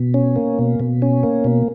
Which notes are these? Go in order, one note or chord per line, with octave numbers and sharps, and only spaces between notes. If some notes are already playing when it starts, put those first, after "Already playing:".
Already playing: B2
C#4
A#3
B2
B2
C#4
A#3
B2